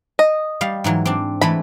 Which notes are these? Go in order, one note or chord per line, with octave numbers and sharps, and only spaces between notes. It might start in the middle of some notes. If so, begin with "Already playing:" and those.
D#5
G3 F5
G#2 E3 F#3
C4 D4
E3 G#3 A3 B5